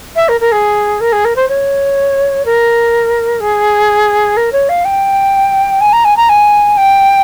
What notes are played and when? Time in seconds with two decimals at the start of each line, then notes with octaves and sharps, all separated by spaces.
0.16 E5
0.29 A#4
0.40 A#4
0.52 G#4
1.00 A#4
1.12 G#4
1.25 A#4
1.36 C5
1.48 C#5
2.45 A#4
3.40 G#4
4.37 A#4
4.52 C#5
4.69 F5
4.85 G5
5.81 G#5
5.93 A#5
6.05 G#5
6.17 A#5
6.29 G#5
6.77 G5